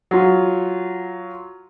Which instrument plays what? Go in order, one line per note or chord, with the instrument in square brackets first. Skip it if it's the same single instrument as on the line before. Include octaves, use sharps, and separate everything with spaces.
[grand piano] F#3 F4